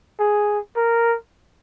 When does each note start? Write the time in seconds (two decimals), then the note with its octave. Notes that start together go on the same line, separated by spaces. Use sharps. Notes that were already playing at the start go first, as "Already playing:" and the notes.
0.20 G#4
0.76 A#4